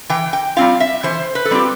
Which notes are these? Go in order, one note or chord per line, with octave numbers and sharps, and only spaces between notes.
E3 G5
G5
G3 C4 F4 F5
E5
E3 C5
B4
A4
G3 C4 F4 G4